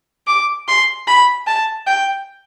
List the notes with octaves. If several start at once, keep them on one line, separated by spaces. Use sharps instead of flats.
D6
C6
B5
A5
G5